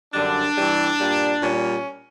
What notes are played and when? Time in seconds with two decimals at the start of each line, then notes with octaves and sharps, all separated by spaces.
0.13 F#2 D3 G3 D4
0.56 G2 E3 G3
0.99 A#2 G3
1.42 A#2 G3 C#4